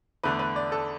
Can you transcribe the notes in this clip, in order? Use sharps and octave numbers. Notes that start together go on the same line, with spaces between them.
E2 D3 A3 B4
B4
D5
A4